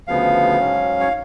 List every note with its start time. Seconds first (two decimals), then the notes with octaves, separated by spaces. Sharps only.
0.07 D2 C#3 F3 B3 F5
0.58 G#2 F#3 C#4
1.00 C#5